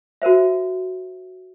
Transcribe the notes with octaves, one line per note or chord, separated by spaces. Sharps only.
F#4 A#4 C5 E5